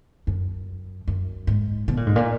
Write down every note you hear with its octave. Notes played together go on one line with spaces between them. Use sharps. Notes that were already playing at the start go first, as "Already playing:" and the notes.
F#2
F#2
G#2
B2
A#2
G#2
A#2